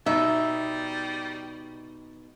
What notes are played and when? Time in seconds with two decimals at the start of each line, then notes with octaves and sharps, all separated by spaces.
0.06 B2 G3 D#4 E5